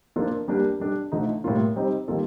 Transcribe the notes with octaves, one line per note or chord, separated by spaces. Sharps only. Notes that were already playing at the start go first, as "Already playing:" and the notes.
F3 A#3 D4 F4 A4
G3 A#3 D4 G4 A#4
G3 D4 A4
D3 F3 A3 D#4
A2 G3 A#3 F4
G3 C4 D#4
D#3 G3 A#3 F4 A4